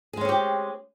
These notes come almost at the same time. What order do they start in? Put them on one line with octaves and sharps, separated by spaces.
G#4 G#3 C#4 C4 G4